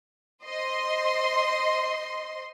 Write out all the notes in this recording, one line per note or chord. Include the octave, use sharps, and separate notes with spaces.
C5 D#5 C6